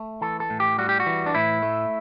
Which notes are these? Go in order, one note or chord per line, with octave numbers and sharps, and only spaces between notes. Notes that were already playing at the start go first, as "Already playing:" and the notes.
Already playing: A3
E3 A4
A4
A2
G4
G3 F#4
G4
F#4
E3
D4
A2 E4
A3